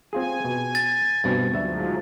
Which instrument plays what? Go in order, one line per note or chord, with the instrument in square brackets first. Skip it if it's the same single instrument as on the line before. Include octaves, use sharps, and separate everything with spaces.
[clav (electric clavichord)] C4 F4 G#4 [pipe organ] G#5
[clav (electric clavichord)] B2
[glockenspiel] A6
[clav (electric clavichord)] G2 B2 C4
[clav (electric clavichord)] D2 E5 [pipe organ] G#2 F3 F#3